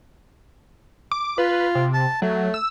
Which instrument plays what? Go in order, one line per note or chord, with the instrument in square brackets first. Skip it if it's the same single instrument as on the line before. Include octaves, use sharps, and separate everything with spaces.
[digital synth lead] D6
[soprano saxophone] F4 [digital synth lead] B4
[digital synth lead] C3
[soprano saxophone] A5
[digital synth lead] F#3 [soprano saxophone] A3
[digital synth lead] E6